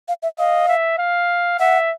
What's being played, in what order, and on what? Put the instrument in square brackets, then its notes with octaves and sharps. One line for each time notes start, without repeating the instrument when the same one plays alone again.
[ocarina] F5
E5
[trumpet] D#5 [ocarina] F5
[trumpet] E5
F5
[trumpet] E5 [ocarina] F#5